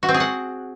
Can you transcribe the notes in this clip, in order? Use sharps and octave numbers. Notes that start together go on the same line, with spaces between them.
F#4
C4
G#4
F#5